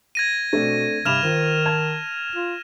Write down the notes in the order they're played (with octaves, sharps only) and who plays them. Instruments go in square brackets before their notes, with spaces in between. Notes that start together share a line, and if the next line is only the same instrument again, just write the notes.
[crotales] G#6 A#6 D#7
[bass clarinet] B2 [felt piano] A3 C4 D4
[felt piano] G2 B5 D6 [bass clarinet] C3 [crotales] F6 E7 F7
[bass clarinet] D#3 [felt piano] F4 C5
[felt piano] A5 G#6
[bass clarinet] F4